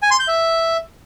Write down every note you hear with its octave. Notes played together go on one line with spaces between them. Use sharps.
G#5
C6
G6
E5